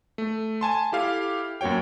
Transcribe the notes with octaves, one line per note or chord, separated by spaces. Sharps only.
A3
G#5 A5 C6
E4 G4 A4 F5
F#2 A#3 F#4 C#5 G5